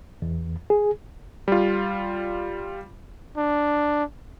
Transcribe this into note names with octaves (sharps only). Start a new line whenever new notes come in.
E2
G#4
G3 F4
D4